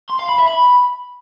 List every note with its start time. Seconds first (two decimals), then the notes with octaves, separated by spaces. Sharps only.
0.10 C6
0.19 F5
0.29 B5
0.38 E5
0.48 B5